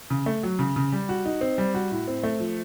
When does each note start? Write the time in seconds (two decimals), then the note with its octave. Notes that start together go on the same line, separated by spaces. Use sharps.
0.10 C#3
0.26 A3
0.43 F#3
0.59 C#3
0.76 C#3
0.92 G3
1.09 F#4
1.25 D#4
1.41 C4
1.58 G3
1.75 F#4
1.91 A2
2.08 C4
2.23 A3
2.40 F3